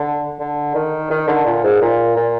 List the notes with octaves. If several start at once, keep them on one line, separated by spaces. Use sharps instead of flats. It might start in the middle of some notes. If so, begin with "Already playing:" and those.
Already playing: D3
D3
D#3
D#3
D3
A#2
G#2
A#2
A#2